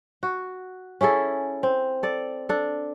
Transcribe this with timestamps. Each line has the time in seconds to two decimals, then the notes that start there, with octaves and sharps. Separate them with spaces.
0.23 F#4
1.01 C#4 E4 G#4 A4
1.63 C4
2.03 A4 D5
2.49 D4 A4